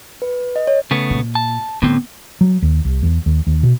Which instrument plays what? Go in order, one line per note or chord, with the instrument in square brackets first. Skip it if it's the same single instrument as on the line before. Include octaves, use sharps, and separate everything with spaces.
[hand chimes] B4
D#5
C#5
[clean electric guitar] C#3 A3 B3
[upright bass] A#2
[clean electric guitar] A5
[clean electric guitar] A2 D3 C4 [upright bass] B3
[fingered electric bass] F#3
D#2
C2
E2
D#2
D#2
B2